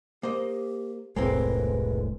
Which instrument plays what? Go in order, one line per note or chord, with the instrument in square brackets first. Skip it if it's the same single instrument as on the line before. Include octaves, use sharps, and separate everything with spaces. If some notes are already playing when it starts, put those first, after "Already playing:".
[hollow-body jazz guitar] A#3 C5 D#5 [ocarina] G4
[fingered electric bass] E1 C2 A2 [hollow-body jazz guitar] G#3 A#3 C4 [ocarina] B4